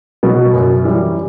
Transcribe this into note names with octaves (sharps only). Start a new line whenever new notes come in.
B2 F#3 B3
F#2
E3 G3